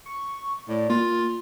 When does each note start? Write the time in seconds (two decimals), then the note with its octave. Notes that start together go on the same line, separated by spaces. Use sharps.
0.06 C#6
0.69 A2 D5
0.90 A#3 F4